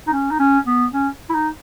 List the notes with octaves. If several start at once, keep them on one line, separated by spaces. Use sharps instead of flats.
D#4
C#4
D#4
C#4
B3
C#4
E4
D#4